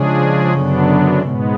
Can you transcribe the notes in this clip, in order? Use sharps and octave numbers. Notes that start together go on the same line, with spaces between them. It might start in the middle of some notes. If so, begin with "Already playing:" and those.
Already playing: C#3 F3 G#3 D4 G#4
F#2 D3 F#3 B3 D4
G#2 B2 G#3 B3